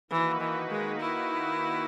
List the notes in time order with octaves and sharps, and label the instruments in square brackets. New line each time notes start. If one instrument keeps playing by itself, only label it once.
[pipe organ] D#3 A#3 D#4 F#4 B4 [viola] E3
[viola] E3
G#3
E4